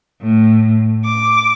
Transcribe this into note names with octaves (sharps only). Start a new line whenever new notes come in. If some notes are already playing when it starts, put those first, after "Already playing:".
A2
D6